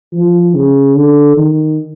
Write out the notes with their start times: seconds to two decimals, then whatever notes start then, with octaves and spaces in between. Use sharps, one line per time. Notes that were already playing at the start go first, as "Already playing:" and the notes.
0.13 F3
0.54 C#3
0.96 D3
1.37 D#3